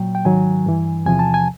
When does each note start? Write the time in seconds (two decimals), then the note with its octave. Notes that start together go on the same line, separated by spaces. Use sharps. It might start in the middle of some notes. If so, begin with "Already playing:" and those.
Already playing: A#2 F#3 G5
0.15 G5
0.25 G#2 D#3 F#3 G#5
0.66 G2 E3
1.06 E2 C3 F3 G#5
1.19 A5
1.34 G#5